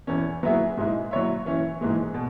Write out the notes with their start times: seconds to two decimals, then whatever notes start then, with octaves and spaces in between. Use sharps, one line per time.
0.07 E2 E3 C#4
0.43 F#3 B3 E4 G#4 E5
0.77 G#2 G#3 E4
1.11 F#3 E4 C#5 E5
1.46 E3 C#4 E4
1.81 G#2 E3 G#3
2.14 B2